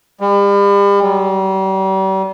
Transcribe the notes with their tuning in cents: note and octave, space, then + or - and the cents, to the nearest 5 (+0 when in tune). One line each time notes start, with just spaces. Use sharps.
G3 +40
G3 -40